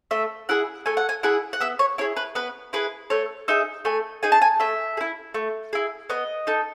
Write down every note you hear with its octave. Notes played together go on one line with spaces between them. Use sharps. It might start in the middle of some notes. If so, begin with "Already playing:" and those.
A3 E5
E4 G#4 F#5
A3 G#5
F#5
G#5
E4 G#4 F#5
F#5
B3 E5
C#5
E4 G#4 C#5
B4
B3 B4
E4 G#4 B4
A3 C#5
D#4 G#4 E5
A3 G#5
D#4 G#4 G#5
A5
G#5
A3 E5
G#4
E4
A3
E4 G#4
B3 D#5
D#4 A4